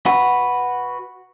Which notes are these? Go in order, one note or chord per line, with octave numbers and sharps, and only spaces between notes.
F#4 B4